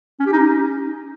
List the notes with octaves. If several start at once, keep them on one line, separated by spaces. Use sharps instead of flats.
C#4
G4
D#4
C#4